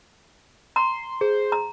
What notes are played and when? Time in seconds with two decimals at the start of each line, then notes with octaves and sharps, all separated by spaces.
0.76 A#5 C6
1.21 G#4 C5
1.52 A#5